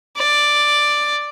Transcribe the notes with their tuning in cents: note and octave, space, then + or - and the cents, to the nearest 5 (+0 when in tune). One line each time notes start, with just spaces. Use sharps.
D5 +5